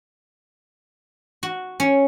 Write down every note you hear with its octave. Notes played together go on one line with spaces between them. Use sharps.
F#4
C#4